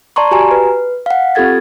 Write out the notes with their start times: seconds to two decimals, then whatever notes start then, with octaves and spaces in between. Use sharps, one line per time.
0.16 D5 A5 A#5 C6 C#6
0.31 F#4 G4 G#5 A#5
0.51 B4
1.06 F5 F#5
1.35 C4 F4 G4 A4 G#6 A6